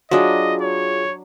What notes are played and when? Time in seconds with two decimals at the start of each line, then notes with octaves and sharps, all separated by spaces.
0.11 F#3 D4 F4 G#4 D#5
0.61 C#5